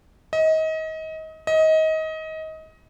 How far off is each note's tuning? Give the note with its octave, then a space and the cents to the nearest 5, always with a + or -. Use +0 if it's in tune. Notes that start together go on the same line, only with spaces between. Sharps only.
D#5 +30
D#5 +25